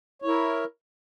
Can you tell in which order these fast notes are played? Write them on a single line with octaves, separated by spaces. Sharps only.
C#5 E4 A#4